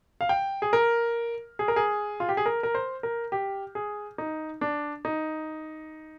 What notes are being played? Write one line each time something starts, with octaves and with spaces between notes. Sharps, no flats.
F5
G5
G#4
A#4
G#4
A#4
G#4
F4
G4
G#4
A#4
A#4
C5
A#4
G4
G#4
D#4
D4
D#4